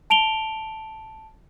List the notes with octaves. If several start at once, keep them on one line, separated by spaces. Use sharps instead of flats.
A5 D7 F7 G7